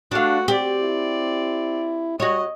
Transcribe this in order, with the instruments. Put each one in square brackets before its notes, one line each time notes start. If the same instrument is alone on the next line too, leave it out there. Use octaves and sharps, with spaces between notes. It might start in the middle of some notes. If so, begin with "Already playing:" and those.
[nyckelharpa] A3 F#4 [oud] D4 F5
[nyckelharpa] C4 D5 [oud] G4
[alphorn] E4
[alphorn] G3 [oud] F#4 C#5 [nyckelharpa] D#5